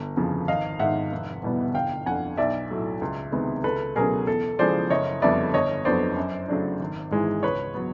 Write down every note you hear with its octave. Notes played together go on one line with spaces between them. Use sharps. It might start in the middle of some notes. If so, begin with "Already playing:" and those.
Already playing: G1
F2 C#3 F3
G#1 D#5 F5
G#2 D#3 E5 F#5
F1
E2 B2 G3 B3
G1 F5 G5
F2 D3 F#5 G#5
B1 D5 E5
A2 F#3 A3
C#2
C3 D#3 G#3 B3
C#2 A4 B4
B2 F#3 A3 C#4 G#4 A#4
E2 A4
C#3 F3 G#3 C5 D5
F#1 C#5 D#5
F2 D3 G3 B3 D5 E5
G1 C#5 D#5
F2 D3 F#3 B3 C5 D5
F#2
C#3 F#3 A3 D4
G#1
G#2 E3 G#3
C#2 B4 C#5
F#3 B3